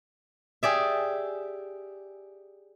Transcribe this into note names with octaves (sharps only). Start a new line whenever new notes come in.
G4 G#4 D5 E5